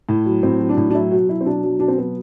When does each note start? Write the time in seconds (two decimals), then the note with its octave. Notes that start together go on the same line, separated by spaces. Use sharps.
0.09 A2
0.26 F#3
0.43 A2 C4
0.60 F#3
0.69 D4
0.77 A2
0.90 D4
0.95 F#3 E4
1.11 B2 F#4
1.29 F#3 E4
1.41 C4
1.45 B2 D4
1.64 F#3
1.80 B2 D4
1.88 C4
1.98 F#3 B3